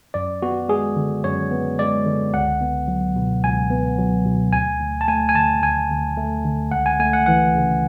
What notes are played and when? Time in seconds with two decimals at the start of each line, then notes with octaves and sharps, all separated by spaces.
0.14 F#2 D5
0.42 B3 F#4
0.69 G#3 G#4
0.96 D3
1.24 F#2 C#5
1.51 B3
1.79 G#3 D5
2.06 D3
2.34 C#2 F#5
2.61 B3
2.88 F#3
3.16 B2
3.43 C#2 G#5
3.70 B3
3.98 F#3
4.26 B2
4.53 D2 G#5
4.80 D2
5.01 A5
5.08 A3 G#5
5.29 G#5
5.35 D3 A5
5.62 D2 G#5
5.90 D2
6.17 A3
6.45 D3
6.71 C#2 F#5
6.86 G#5
6.99 A3 G#5
7.13 F#5
7.26 E3 F#5
7.55 C#3